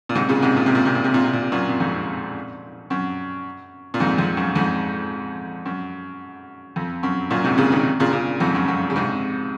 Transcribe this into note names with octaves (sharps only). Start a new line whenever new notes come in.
A#2
G#2 C3
A#2 C#3
G#2 C3
A#2
C3
A#2
C3
A#2
C3
A#2
C3
A#2
C3
F#2 A#2
A#2
F2 G#2
F#2
A#2
F2 G#2
F2
F#2
F2 G#2
F#2
F2
F#2
F#2 A#2
G#2 C3
A#2 C#3
C3 D#3
A#2 C#3
A#2 C#3
F2 G#2
F#2
F#2
C#3
G#2 C3